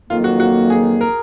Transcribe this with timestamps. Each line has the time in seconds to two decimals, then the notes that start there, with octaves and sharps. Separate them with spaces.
0.09 F2 D#3 F#3 A#3 F4
0.24 F#4
0.40 F#4
0.70 G#4
1.01 A#4